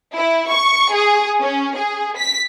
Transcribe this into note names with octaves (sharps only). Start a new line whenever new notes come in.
E4
C#6
G#4
C#4
G#4
B6